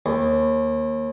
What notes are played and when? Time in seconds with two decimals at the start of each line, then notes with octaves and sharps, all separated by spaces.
0.06 D#2